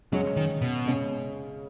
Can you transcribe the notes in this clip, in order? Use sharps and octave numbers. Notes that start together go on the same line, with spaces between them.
C#3 F#3 G#3 C#4
D#3
B2
C#3 G#3 C#4